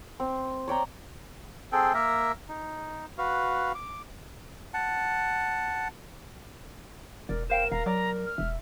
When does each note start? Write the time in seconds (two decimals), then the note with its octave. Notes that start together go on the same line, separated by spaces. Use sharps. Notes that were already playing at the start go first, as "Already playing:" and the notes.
0.20 C4
0.68 C#5 D5 G5 A#5
1.72 C4 G#4 A4 G5
1.94 A#3 A#4 E5
2.48 D#4
3.18 F#4 B4 F5
3.75 D6
4.74 F#5 A5
7.29 E1 A#4 D5
7.50 A#4 C5 F5 G5 E7
7.72 D#1 F5 A#5
7.86 F#3 D5 A#5
8.26 F6
8.38 E1 E5